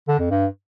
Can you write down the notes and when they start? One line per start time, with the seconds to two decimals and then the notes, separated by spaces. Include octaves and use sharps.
0.08 D3
0.19 F2
0.31 G2